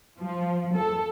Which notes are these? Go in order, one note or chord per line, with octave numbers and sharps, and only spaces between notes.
F3
A4